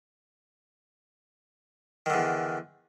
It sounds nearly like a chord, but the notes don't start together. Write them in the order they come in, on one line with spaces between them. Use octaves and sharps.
D#3 D3 E2